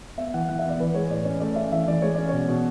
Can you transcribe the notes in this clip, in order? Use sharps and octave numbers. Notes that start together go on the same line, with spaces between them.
B3 E5
E3 F#5
E3 F#5
E5
B3
D5
E3 B4
G#3 C#5
A2 D5
C#4
A3 D5
C#4 E5
E3 E5
E3 D5
G#3 C#5
C#4 D5
B2 C#5
B2